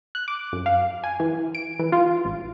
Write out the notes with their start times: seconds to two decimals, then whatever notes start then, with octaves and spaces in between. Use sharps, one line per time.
0.15 F#6
0.28 D6
0.53 F#2
0.66 F5
1.04 G#5
1.20 E3
1.55 D7
1.79 E3
1.92 F4
2.25 A1